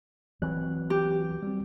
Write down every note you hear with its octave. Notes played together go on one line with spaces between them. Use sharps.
G1 E3 F#3 C4 F#6
G4
G3 C4